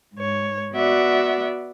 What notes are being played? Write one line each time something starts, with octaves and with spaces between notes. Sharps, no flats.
G#2 C#5
B3 F#4 D5 E5 F#5